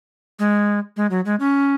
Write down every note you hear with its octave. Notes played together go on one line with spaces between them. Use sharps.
G#3
G#3
F#3
G#3
C#4